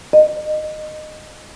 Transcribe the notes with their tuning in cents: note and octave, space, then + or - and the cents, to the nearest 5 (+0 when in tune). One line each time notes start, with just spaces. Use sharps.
D#5 -20